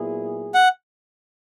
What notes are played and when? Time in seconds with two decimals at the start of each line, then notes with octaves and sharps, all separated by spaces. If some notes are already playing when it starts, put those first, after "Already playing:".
Already playing: A#2 F#3 B3 E4 G#4
0.54 F#5